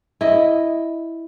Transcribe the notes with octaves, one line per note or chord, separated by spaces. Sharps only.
E4 D#5